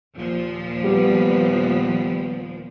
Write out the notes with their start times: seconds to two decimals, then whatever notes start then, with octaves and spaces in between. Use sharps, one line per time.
0.16 D#2 A#2 F3
0.84 G3 B3